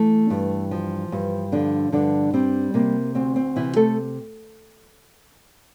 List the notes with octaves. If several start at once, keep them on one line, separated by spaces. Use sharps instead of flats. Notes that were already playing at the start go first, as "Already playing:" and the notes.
Already playing: E3 A3
G2
F3
G2
D3 F3 D4
G2 D3 D4
G3 C4
C3 A#3
D2 C4
C4
C3 E3 E4
A3 A4